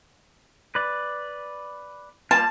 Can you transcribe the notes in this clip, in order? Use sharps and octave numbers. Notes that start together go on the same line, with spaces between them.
B4 D5
G3 A#3 F4 A5